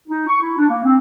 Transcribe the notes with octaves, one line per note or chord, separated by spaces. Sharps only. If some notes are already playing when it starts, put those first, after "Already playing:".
D#4
C#6
E4
D4
A#3
C4